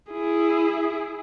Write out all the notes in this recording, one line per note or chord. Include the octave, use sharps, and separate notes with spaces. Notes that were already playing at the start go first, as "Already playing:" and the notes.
E4 G#4